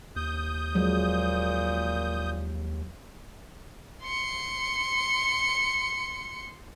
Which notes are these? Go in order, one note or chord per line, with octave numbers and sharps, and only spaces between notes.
D#2 D#6 G6
A#2 F3 F#3 G#3
C6 C#7